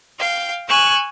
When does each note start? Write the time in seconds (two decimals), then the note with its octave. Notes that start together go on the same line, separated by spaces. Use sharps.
0.19 F5 G5
0.68 G#5 C#6 E6 F#6